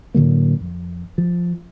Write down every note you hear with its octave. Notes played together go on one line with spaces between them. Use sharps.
A2 D3 F#3 A#3
F2
F3